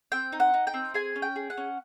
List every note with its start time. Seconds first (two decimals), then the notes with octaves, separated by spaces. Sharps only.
0.12 C4 G5
0.33 D#4
0.40 F#5
0.54 D#4
0.67 G5
0.74 C4
0.94 G#4 G#5
1.16 C#4
1.22 G5
1.36 G#4
1.50 F#5
1.57 C#4